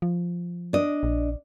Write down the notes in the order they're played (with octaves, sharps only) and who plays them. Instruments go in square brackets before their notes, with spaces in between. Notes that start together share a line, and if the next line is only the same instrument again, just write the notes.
[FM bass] F3
[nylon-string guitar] D4 D#5
[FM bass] A#1